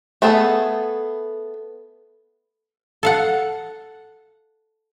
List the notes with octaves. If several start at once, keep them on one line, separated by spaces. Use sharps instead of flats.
A3 B3 G#4 A4
A4 F5 F#5